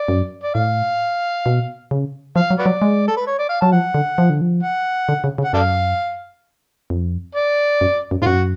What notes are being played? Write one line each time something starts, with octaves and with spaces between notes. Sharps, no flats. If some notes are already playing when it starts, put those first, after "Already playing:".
Already playing: D5
F#2
D5
A2 F5
B2
C#3
F3 F5
F#3
F#4 B4 D5
F#3
G#3
A4
B4
C#5
D5
F5
F#3 A5
F3 F#5
D3
F3
D3
F3
F#5
D3
C#3
C#3
F#5
F#2 A4 D5 F5
F2
D5
F#2
F#2
G#2 F4
F#2 F#4